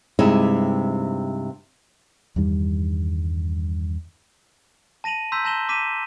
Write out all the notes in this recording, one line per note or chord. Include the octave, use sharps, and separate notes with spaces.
G2 C3 G#3 D#4 E4
E2 G2 D#3 G3
A5 A#6 D#7 F7 F#7
A#5 C6 E6 G6 B6
A5 G6 A#6 E7 F#7 G7
A5 D6 B6 D#7 E7